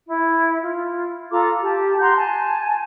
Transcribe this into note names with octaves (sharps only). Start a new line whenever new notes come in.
E4
F4
F4 A4 A#5 D6
G4 A5
F#5 A#5 C6 G6
G#5 A5